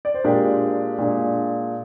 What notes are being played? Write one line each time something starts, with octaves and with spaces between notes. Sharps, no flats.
D5
C5
A#2 G#3 D4 G4 A#4
A#2 G#3 D4